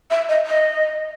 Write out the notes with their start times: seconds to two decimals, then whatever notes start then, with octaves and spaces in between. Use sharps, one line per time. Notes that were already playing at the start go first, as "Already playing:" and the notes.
0.11 E5
0.29 D#5
0.46 D#5